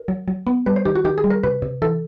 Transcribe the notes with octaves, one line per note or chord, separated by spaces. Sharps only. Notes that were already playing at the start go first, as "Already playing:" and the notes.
Already playing: A#4
F#3
F#3
B3
G3 B4
C5
D#3 G4
F#4
D#3 G4
G#4
G3
A#4
C3 B4
C3
E3 A4